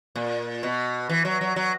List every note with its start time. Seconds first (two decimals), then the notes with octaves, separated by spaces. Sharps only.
0.15 A#2
0.63 B2
1.09 E3
1.25 F#3
1.41 F#3
1.56 F#3